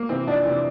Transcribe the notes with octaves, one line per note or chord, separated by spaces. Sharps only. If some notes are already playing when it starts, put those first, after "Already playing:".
Already playing: A#3
C3 E3 C4
F2 D4
C3 E3